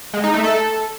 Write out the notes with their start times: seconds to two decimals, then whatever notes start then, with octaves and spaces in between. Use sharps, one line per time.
0.14 G#3
0.24 D#4
0.34 A3
0.44 A4